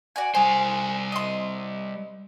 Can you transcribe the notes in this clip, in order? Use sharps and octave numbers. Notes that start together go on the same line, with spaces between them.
F#4 D5 G#5
G3 G#4 C5
D#5 C6